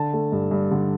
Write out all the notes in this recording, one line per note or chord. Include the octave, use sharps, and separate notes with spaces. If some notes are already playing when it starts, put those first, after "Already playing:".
Already playing: D3 A5
A3
G2
G2
D3